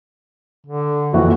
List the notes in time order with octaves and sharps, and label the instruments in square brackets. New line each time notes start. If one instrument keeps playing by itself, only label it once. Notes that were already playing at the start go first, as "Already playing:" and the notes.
[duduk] D3
[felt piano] A#1 F2 E3 [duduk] F#4